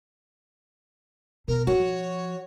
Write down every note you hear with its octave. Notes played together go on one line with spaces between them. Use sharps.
B2 A#4
F3 F#4 C#5